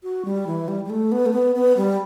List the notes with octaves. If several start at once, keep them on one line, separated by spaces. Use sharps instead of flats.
F#4
G3
E3
G3
G3
A3
B3
A3
B3
B3
G3